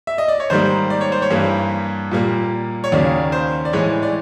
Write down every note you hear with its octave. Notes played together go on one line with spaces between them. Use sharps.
E5
D#5
D5
C#5
G#2 D#3 G3 A#3 C5
D5
C#5
C5
C#5
G2 E3 G3 A#3
A#2 G3 A#3
C#5
D#2 C#3 F#3 A#3 D5
C5
D5
A2 E3 G#3 C#5
D5